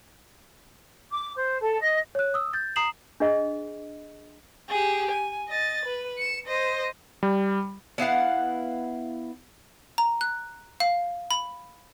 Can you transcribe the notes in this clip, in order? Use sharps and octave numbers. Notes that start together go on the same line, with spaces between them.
D6
C5
A4
D#5
C#5 F#6
D#6 E6
G6 A6
A#5 D#6 C7 E7 F#7
D4 G#4 D#5
G4 G#4
G#5
D#5 A6
B4
C#7 E7
C5 D#5
G3
B3 E4 F5 F#5
A#5
F#6
F5
B5